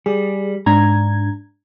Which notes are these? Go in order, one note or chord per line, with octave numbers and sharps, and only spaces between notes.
G3 G#4
G#2 D4 A#5 G#6